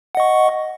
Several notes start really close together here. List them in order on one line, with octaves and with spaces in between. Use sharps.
F#5 D#5 C#6